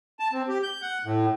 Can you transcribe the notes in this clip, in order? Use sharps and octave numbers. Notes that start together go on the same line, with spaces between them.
A5
C4
G4
G6
F#5
A2